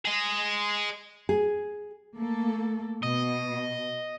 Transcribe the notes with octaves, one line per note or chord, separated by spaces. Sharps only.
G#4 D#5
G#4
A3 A#3 A4
B2 D#5